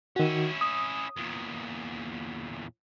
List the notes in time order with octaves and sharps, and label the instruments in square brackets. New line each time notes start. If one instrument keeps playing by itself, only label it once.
[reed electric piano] D#3 F#4 [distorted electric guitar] C#4 E4
[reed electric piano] D#6
[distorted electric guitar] E2 A#2